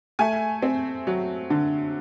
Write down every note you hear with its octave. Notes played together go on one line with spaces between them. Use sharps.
A3 G#5
C4
F#3
D3